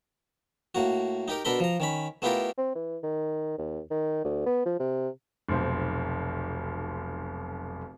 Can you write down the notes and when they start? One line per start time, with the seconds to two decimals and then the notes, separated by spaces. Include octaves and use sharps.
0.75 A2 A#3 F#4
1.28 D#4 G4 A#4
1.45 B2 D4 A4 A#4 B5 C6
1.60 F3 A#5
1.80 D#3 C#4 B5
2.22 A3 B3 E4 F4 G4 A#4
2.58 C4
2.75 E3
3.03 D#3
3.58 D#2
3.91 D#3
4.24 D2
4.46 B3
4.66 F3
4.80 C3
5.49 F1 B1 C5